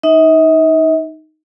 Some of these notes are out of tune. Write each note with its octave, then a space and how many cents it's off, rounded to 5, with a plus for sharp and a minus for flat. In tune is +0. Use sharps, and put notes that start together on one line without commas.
D#4 +0 E5 -45